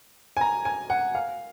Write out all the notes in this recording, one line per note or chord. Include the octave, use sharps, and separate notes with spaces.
G#5
A#5
G#5
F#5
F5